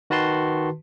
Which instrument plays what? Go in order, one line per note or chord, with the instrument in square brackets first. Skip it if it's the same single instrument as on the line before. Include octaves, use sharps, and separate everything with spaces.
[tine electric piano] D#3 F#4 B4 A5 C6